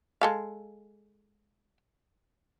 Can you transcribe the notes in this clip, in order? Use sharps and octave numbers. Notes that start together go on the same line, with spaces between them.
G#3 A4 F5